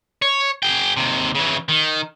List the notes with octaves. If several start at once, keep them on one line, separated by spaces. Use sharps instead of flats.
C#5
G#4 G5
D#2 C3
C#3 E3
D#3